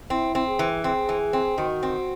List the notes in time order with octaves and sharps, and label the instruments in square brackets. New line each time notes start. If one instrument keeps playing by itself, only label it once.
[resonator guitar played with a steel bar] C4 [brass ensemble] E4
[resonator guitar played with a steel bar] C4
[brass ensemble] G#4
[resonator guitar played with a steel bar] E3
[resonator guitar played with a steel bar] C4 [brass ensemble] G#4
[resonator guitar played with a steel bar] E3
C4
[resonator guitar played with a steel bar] D#3 [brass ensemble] F#4
[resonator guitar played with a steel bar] C4